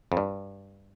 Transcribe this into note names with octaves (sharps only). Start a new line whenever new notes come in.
F2
G2